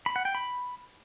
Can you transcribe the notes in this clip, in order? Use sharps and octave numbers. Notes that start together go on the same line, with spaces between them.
B5
F#5
G5
B5